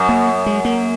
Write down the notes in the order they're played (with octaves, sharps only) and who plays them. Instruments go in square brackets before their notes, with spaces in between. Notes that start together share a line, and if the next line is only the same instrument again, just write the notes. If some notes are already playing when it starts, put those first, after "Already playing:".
Already playing: [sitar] F#2
[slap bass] A#3
G#3
A#3